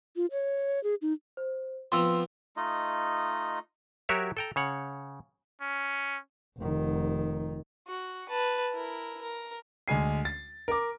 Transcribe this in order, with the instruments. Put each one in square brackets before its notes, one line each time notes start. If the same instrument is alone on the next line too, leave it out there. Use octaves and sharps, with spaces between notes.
[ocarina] F4
C#5
G#4
D#4
[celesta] C5
[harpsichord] F3 B3 C4 [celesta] C6 E6
[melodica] A3 D#4 F4 D#5
[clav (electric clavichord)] F#3 F#4 G4 A#4 C#5 E5
A4 G5 A#5
C#3 C#5 F#5
[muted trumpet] C#4
[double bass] F1 D#3
[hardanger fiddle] F#4
B4 A5
E4 A#4
A#4
[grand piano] D2 G#3 G#5 C7
A6
A#4 D6